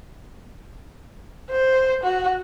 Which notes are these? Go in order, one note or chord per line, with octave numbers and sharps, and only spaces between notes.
C5
F#4